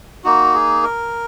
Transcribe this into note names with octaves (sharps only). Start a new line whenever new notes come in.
A#3 D#4 F#4
G#4
A#4